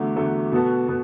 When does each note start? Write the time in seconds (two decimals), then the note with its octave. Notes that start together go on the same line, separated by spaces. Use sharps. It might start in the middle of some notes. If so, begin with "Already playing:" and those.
Already playing: E2 D3 F#3 A3
0.16 E2 D3 F#3 A3
0.52 B2 B3 F#4 A4
0.88 B2 B3